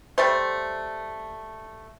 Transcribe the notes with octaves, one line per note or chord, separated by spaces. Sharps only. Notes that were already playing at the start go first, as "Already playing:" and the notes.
G3 A3 C5